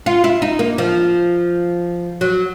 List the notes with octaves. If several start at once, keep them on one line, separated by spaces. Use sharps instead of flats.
F4
E4
D#4
A#3
F3
F#3